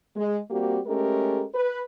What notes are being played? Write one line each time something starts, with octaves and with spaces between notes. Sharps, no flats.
G#3
G3 A#3 C4 F#4 G4
G#3 A3 C#4 G4 A4 A#4
B4